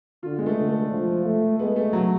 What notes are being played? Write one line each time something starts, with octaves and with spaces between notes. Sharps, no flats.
D3 F4
G#3
A3
D3
A3
F3
A3
G#3 B3
A3
F#3